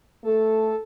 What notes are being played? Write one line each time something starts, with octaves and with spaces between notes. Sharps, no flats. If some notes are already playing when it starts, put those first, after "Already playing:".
A3 A4